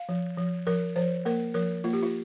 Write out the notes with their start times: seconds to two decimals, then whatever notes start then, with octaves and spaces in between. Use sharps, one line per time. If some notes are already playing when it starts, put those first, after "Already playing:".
Already playing: F5
0.09 F3
0.38 F3
0.67 F3 A#4
0.96 F3 C5
1.25 A#3 A#4
1.54 F3 A#4
1.84 A#3 F4
1.93 G4
2.02 F4